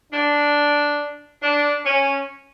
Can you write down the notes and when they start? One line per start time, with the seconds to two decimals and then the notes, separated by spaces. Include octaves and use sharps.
0.12 D4
1.41 D4
1.84 C#4